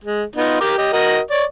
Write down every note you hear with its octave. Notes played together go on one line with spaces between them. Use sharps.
G#3
B3 D#4 F4
G4 A#4 D6
G4 D#5
F#4 A#4 D#5
C#5 D5